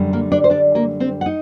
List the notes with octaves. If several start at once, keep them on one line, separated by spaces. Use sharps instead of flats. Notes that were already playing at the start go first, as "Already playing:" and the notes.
Already playing: F#2 D3 G3
A#3 A#4
D4 D5
C5
D4 D5
A#3 A#4
C4 C5
F#5
D#4 D#5